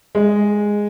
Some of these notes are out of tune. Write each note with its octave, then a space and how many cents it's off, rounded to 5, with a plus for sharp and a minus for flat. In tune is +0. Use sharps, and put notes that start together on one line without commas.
G#3 -5